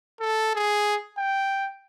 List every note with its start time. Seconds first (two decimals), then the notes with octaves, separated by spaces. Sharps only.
0.20 A4
0.55 G#4
1.18 G5